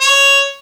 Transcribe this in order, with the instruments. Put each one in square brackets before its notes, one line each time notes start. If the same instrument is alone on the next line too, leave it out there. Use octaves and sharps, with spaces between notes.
[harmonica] C#5